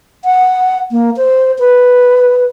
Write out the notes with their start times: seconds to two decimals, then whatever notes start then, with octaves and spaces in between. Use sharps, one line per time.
0.25 F#5
0.91 A#3
1.17 C5
1.59 B4